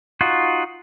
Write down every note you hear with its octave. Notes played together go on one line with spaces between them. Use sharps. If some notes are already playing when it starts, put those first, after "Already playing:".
D#4 F4 F#4